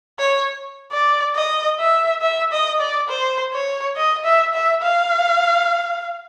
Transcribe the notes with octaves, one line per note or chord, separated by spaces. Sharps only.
C#5
D5
D#5
E5
E5
D#5
D5
C5
C#5
D#5
E5
E5
F5